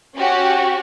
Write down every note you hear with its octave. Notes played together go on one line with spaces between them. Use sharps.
C#4 F#4 G4